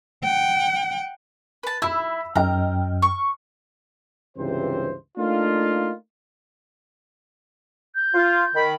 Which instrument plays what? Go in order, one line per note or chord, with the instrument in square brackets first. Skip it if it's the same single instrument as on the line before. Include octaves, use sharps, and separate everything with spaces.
[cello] F#5 G5
[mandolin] B4 A5
[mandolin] E4 [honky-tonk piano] B5 E6
[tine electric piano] F#2 [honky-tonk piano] D#5 G5 F6 [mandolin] A#5
[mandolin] C#6
[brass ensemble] C#2 G2 C3 E3 C5
A3 A#3 D4 D#4 F4
[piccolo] G6
[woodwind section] F4
D#3 B5